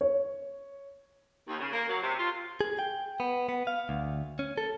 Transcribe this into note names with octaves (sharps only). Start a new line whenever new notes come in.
C#5
D#2
C#3
A#3
F#3
C3
F4
G#4
G5
B3
B3
F5
D2
C#4
A4